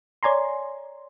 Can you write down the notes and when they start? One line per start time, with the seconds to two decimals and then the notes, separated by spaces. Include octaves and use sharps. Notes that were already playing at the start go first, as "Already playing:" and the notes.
0.23 C#5 D5 G#5 A#5 C6